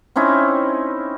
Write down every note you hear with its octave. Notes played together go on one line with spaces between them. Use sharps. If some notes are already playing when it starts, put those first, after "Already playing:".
C4 C#4 D#4 E4